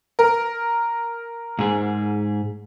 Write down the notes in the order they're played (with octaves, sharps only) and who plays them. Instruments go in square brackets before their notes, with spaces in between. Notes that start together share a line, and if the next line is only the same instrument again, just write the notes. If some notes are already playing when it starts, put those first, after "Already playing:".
[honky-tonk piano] A#4
[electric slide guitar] G#2 G#4